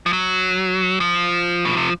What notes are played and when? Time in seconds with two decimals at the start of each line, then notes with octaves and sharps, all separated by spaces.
0.06 F3
0.13 F#3
1.00 F3
1.65 B2
1.77 C3